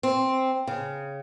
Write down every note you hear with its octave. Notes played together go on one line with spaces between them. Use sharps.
C4
C#3